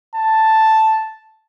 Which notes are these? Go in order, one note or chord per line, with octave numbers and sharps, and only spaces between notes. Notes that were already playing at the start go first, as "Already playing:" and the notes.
A5